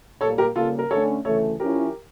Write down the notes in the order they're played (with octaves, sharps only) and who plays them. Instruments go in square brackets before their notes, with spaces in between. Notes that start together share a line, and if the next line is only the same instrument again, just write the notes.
[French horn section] A#2 G3 A#3 [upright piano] A4 C#5
[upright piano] G4 A#4
[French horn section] C#3 G3 A#3 [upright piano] F4 A4
[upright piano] A#4
[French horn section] D3 A3 C#4 [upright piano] A4 C#5
[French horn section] D2 C#3 E3 A3 [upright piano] A4 C#5
[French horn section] F3 C#4 E4 [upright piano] G4 A#4